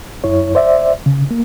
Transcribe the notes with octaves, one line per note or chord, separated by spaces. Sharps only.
F#2 E4 C#5
C5 D5 E5
C#3
A#3